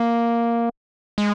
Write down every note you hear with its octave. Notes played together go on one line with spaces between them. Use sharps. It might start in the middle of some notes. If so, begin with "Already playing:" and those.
Already playing: A#3
G#3